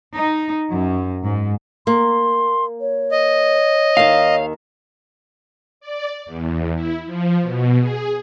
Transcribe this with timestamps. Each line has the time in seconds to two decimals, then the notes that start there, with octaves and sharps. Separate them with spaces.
0.16 D#4
0.71 F#2
1.23 G#2
1.87 A#3 C6
2.81 C#5
3.11 D#5
3.97 D#2 D#3 F5
5.81 D5
6.26 E2
6.74 E4
7.06 F3
7.42 B2
7.80 G#4